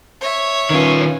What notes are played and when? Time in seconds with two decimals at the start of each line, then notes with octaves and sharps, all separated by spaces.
0.21 C#5 E5
0.70 D#3 C#4 F4 B4